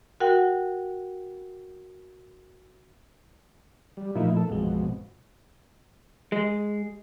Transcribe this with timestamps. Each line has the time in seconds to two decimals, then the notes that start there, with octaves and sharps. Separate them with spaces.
0.20 F#4 A#4 F#5 G5
3.97 G3
4.15 A#2 F3 A3 A#3 D#4 E4
4.37 A4
4.50 A1 F2 B2 G#3
6.32 G#3